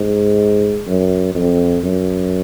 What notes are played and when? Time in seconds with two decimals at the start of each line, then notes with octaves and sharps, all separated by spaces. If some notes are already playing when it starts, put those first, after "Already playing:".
Already playing: G#2
0.87 F#2
1.35 F2
1.83 F#2